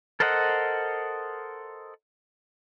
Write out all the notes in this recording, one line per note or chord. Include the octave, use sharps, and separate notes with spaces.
A4 A#4 C5 D#5 F#5